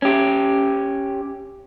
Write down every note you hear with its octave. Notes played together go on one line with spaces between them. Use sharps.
C#4 G4